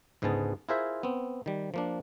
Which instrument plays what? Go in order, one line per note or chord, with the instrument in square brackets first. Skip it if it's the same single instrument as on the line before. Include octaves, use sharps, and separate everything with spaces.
[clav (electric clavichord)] C#2 G#2 D3 B3 G#4 A5
E4 F4 G#4 A#4 C5 E5
B3 C4
D#3 G3
F3 A#3 D4